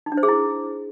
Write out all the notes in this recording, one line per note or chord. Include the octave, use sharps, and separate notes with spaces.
D#4
D4
C5
G#4
E4